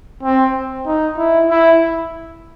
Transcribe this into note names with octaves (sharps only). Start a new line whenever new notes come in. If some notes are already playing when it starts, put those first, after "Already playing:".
C4
D#4
E4
E4